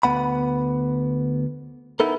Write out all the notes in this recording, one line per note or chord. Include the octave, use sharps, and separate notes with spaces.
D2 B3 F#5 B5
B3 D#4 E4 A4 A#4